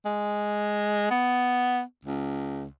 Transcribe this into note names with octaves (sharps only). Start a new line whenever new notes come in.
G#3
B3
C#2